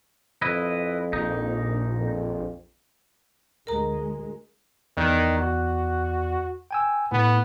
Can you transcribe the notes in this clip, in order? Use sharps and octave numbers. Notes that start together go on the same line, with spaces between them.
F2 E4 B4 D#5
A#1 A#2 D#4
F2
D2 G#3 A#4 A#5
E2 D#3 D5 F#6
F#4
G5 G#5 E6
A2 B3